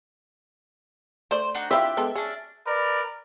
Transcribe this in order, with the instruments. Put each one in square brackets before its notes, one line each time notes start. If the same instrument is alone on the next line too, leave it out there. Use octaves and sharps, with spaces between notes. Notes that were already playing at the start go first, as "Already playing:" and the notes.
[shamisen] A3 D5 [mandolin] C5
[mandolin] D4 D#4 F#4
[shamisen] C4 E4 F4 [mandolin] D4 G4 [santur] E5
[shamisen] G#3 B3 A4
[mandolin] C#4 D4 [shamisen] G#4
[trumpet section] A#4 B4 D5